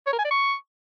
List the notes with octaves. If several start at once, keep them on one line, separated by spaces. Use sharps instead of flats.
C#5
A#4
G#5
D5
C#6